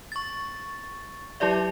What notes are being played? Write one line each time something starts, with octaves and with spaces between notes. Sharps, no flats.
C#6 A6
F#3 E4 G4 D5 E5